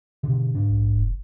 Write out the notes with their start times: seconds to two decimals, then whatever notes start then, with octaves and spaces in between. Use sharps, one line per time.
0.23 B2 D3
0.55 G#2 D4
0.70 A#1
0.95 F1